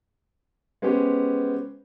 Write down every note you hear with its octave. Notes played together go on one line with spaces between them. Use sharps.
G#3 B3 C#4 G4 C5